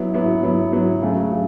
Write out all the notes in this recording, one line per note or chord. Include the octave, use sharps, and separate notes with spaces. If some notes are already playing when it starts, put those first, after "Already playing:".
Already playing: F#3 B3 E4
F#3 B3 E4
F#3 B3 E4
F#3 B3 E4
C#3 F#3 A3
C#3 F#3